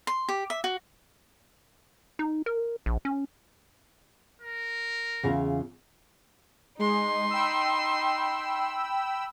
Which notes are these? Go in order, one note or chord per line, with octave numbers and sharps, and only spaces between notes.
C6
G4
E5
F#4
D#4
A#4
A#1
C#4
A#4
E2 C#3 F4
G#3 D#4 C6
G5 B5 E6